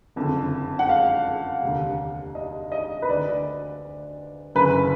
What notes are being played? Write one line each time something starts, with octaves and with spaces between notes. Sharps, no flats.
F#1 F2 D3
F#5
F5
F1 D#2 D3
D#5
D#5
B4
D2 D3 D5
F#1 F#2 D3 B4